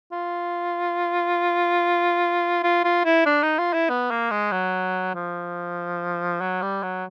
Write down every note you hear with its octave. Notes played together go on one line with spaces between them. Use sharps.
F4
F4
F4
E4
D4
D#4
F4
E4
B3
A#3
G#3
F#3
F3
F#3
G3
F#3